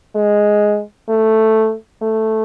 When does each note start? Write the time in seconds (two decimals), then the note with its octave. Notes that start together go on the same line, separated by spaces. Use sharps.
0.16 G#3
1.09 A3
2.02 A3